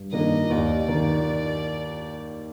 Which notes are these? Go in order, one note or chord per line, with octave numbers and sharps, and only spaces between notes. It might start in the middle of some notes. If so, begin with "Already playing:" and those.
Already playing: G2
D#3 A#3 D4 D#5
D#2 D5
D#3 A#3